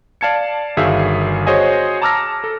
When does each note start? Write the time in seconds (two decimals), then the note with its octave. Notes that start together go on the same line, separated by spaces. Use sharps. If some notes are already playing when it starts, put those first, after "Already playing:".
0.21 D5 F5 A5 G#6 C#7
0.77 G1 D#3 F#4 G#4 E5 F5
1.47 F#4 G#4 C5 C#5 D#5 G#5
2.02 A5 A#5 D6 E6 F6 A#6
2.44 A4